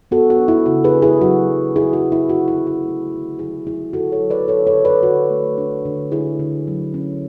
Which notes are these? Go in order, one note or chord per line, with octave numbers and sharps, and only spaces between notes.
B3 F#4 A4
F#4
D4
E4
C#3 F#4
G#4 B4
D4
E4 G#4
F#3 F#4
F#3
F#3 E4 G#4
F#4
F#3
E4
D3 F#4
E4
C#4
F#4
A3
D3
F#3 E4 G#4
F#3 E4 G#4
D3 F#4 A4
A4 C#5
F#3
B4 D5
D3 A4 C#5
A4 C#5
D3
B4 D5
D3 F#4
A3
D4
D3
D3 E4 G#4
D3
F#3
C#4